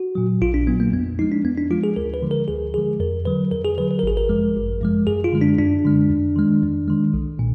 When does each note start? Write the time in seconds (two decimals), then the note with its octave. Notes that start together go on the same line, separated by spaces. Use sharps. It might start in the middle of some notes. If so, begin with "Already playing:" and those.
Already playing: F#4
0.15 A#2 F#3
0.41 A#1 F4
0.54 D4
0.67 A#2 F#3 B3
0.80 A#3
0.93 F2 B3
1.19 F3 G#3 D#4
1.32 D4
1.44 F2 B3
1.58 D4
1.71 F3 G#3 F4
1.84 G#4
1.96 D2 A#4
2.14 B4
2.22 D3 F3 G#3
2.31 A#4
2.48 D2 G#4
2.74 D3 F3 G#3 G#4
3.00 F2 A#4
3.25 D3 F#3 B4
3.51 F2 A#4
3.65 G#4
3.77 D3 F#3 B4
3.91 B4
3.99 A#4
4.03 G#1 G#4
4.17 A#4
4.29 F#2 F3 G#3
4.55 G#1
4.81 F#2 F3 G#3
5.07 F#2 G#4
5.24 F4
5.33 D3 G#3
5.41 D4
5.58 F#2 D4
5.84 D3 G#3
6.10 F2
6.36 D#3 G#3
6.62 F2
6.88 D#3 G#3
7.14 B1
7.39 A#2